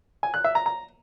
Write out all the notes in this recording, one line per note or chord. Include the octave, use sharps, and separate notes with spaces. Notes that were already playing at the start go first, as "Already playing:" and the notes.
G#5
F#6
E5
A#5
A#5